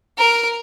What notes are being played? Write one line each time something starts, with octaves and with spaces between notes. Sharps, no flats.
A#4